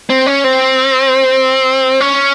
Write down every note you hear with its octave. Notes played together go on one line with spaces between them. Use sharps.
C4
C#4
C4
C#4